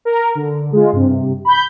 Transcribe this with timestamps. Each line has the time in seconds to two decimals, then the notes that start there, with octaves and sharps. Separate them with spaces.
0.05 A#4
0.35 D3
0.72 G#3 F4
0.93 G2 C3
1.45 B5 G6